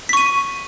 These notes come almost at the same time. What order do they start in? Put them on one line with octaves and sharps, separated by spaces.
B6 C#6 D#7